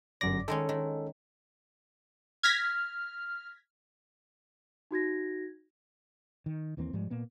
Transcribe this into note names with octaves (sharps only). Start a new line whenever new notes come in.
G1 F#2 D5 A#6
D#3 G#3 C#4 A4
D#3
F6 G#6 A#6 B6
D#4 F#4 G#6 A#6
D#3
D#2 E3 A#3 C4
G#2 F3 G3 G#3
A#2 A#3 B3